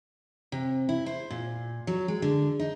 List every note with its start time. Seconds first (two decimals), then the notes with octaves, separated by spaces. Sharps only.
0.52 C3
0.89 E4
1.06 C5
1.30 A#2
1.87 F#3
2.08 G#3
2.22 D3
2.60 D#4